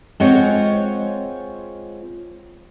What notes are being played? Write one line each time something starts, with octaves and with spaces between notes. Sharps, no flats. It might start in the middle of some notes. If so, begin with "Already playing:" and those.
G#3 C4 F4 C5 C#5 F#5